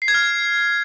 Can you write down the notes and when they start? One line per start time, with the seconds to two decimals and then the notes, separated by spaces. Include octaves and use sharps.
0.02 C7
0.08 G#6
0.14 F6